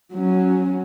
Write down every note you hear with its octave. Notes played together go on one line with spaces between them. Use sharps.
F#3 C#4